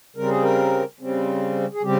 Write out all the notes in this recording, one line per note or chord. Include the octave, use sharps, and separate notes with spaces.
C#3 G3 C4 A#4
G#4
A#4
C#3 G3 C4
G#4
C#3 G3 C4 G4